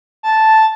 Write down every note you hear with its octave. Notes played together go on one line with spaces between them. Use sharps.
A5